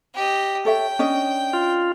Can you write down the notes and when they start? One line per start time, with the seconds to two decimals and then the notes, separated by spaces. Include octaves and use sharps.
0.15 G4 D#5
0.65 A4 C#5 E5 G5
0.99 C#4 D4 D#5
1.53 F4